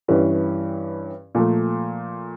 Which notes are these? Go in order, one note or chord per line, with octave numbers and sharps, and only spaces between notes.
G2 E3 G3 C#4 E4
A#2 F3 A3